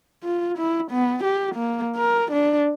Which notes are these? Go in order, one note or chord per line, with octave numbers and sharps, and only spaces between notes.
F4
E4
B3
G4
A#3
A#4
D4